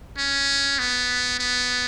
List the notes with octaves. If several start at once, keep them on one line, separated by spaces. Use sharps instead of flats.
C#4
B3
B3